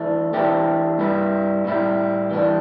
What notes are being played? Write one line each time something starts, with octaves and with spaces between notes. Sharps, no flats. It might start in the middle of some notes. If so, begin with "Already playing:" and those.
Already playing: E3 A3 D4
E3 A3 D4 G4
G2 G3 E4
A2 G3 E4
E3 G3 D4